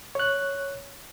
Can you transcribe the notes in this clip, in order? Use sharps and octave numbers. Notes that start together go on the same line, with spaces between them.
C#5 F#6